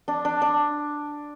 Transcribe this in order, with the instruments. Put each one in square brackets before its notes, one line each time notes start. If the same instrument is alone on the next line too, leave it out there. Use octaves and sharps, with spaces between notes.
[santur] D4
D4
D4